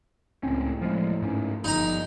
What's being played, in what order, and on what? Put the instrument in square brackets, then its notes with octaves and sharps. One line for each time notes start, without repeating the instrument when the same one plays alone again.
[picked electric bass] C#2 C4 C#4 [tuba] A2
[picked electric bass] F3 G#3
G#2 C#4
[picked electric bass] G1 [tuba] F3 [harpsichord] D#4 A#5